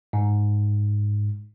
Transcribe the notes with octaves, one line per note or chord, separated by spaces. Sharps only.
G#2